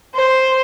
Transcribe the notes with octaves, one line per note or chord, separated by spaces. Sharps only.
C5